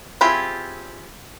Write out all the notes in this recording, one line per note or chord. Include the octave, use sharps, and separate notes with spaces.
C4 E4 F4 G4 G#4